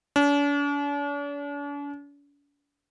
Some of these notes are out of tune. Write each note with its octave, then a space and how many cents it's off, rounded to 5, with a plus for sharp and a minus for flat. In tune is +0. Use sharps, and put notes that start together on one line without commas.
D4 -45